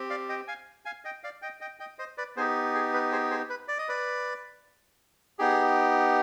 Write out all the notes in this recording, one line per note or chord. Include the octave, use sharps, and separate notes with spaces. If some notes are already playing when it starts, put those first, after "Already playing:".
Already playing: C4 G4
D5 F5
D#5 G5
F5 G#5
F5 G#5
D#5 G5
D5 F5
D#5 G5
D#5 G5
D#5 G5
C5 D#5
B4 D5
B3 D#4 G4 G#4 C5
G#4
B4
G#4 C5
G#4 C5
B4
D5
D#5
B4 D5
B3 D#4 G4 G#4